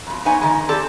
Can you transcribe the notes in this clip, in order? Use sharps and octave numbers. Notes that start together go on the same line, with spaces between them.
F2 B2
F2 B3 D#4 C#5 G#5
D#3 G#3
C4 G4 A4 D5 A5